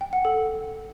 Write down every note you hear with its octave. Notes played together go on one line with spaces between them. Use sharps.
G5
F#5
A4